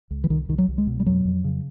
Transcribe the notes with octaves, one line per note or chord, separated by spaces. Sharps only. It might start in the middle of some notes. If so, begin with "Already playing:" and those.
C#2
E3
C2 D#3
C2 D#3
F#3
C2
G#3
B2
G3
F2 F#3
F2
C#3